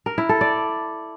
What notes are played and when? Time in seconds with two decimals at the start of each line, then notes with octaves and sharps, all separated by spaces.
0.06 A#4
0.18 E4
0.29 A4
0.41 D5